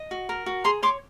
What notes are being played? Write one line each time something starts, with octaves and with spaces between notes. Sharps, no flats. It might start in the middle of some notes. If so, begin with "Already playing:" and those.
Already playing: D#5
F#4
A#4
F#4
G#4 A#5 C6
C#5 C6 D6